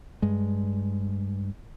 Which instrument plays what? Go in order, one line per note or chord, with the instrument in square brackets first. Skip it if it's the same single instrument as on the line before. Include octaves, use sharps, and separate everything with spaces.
[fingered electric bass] G2 G#3